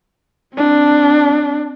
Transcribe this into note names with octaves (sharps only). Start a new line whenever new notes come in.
C4 D4